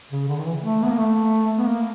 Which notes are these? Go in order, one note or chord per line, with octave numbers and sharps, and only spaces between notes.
C#3
D3
D#3
E3
A3
B3
A#3
A3
B3
A#3